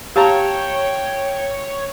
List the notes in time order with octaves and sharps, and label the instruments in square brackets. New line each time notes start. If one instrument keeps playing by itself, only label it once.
[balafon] G4 [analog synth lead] C#5 [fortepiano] F5 A5 A#5 [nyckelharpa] G5